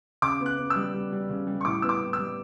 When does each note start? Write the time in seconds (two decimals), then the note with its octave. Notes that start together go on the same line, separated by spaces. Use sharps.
0.22 C#3 D6
0.40 B3
0.46 F#6
0.58 B3
0.70 E6
0.76 G3
0.94 G3
1.12 G3
1.29 C#3
1.47 G3
1.61 C#6
1.65 A2 D6
1.82 B3 E6
1.89 D6
2.01 A2
2.13 E6
2.19 G3